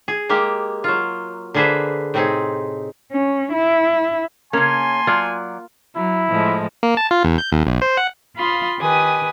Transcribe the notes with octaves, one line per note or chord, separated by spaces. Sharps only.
G#4
G#3 A#3 G4
F#3 F4
D3 A#3 G#4 B4 C5 E5
A2 C3 C4 D#4 G#4
C#4
E4
C#3 A#3 C#4 G#5 A5 C6
F#3 F4 D5
F#3 E4
A2 F3 G#3
A#3
A5
F4
E2
G6
D#2
B1
C5
F#5
F4 F5 B5 C6 D#6
D#3 G4 B4 G#5 D#6